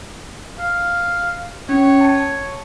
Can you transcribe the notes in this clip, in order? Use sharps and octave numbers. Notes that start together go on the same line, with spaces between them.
F5
C#4 C#5
A5 C#7